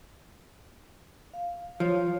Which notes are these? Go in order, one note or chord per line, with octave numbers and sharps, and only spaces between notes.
F5
F3 C#5 F5